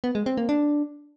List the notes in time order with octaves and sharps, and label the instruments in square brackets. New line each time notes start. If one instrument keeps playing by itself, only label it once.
[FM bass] B3
G#3
C4
A#3
D4